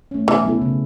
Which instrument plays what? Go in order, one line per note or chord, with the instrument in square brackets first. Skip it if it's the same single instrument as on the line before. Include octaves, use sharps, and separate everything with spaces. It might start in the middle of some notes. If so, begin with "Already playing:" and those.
[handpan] A3 C#4
[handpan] B2 [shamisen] E3
[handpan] F#3 B3 E4 A4
C#3